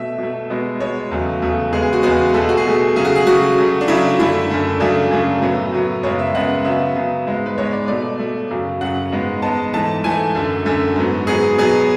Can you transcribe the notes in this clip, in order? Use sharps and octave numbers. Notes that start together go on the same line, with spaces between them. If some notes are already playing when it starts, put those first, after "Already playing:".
Already playing: B2 A3 E5
B2 A3
B2 G#3 B3
B2 G#3 B3 C#5
E2 C#3 F#3 A3
E2 C#3 F#3 A3
E2 C#3 G#3 B3 G#4
G#4
F#4
E2 C#3 G#3 B3 F#4
B2 A3 A4
G#4
F#4
G#4
B2 A3
C#3 F#3 A3 G#4
F#4
G#4
C#3 F#3 A3 F#4
C#3 F#3 A3
D4
C#3 F#3 A3 E4
F#2 D3 A3 E4
F#2 D3 A3
F#2 C#3 F#3 A3 D4
F#2 C#3 F#3 A3
A2 F#3 B3
A2 F#3 B3
F#2 C#3 G#3 B3 C#5
E5
F#2 C#3 G#3 B3 F#5
C#3 F#3 B3 E5
C#3 F#3 B3
G#2 G#3 B3
B4
G#2 G#3 B3 C#5
D5
B2 A3 D5
B2 A3
F#2 C#3 F#3
F#2 C#3 F#3 F#5
G#2 G#3 B3
G#2 G#3 B3 A5
G#2 E3 A3 A5
G#2 E3 A3 G#5
F#2 D3 A3
F#2 D3 A3
G#2 F#3 B3
G#2 F#3 B3 G#4
B2 F#3 B3 G#4